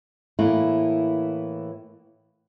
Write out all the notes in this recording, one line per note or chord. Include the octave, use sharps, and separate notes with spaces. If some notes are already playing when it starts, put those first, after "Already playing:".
A2 E3 A#3 E4